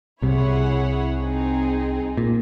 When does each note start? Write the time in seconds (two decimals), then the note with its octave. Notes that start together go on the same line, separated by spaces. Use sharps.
0.22 C2 C3 E4 G#4 C#5 F#5
1.20 C4 D#4 G#4
2.17 A#2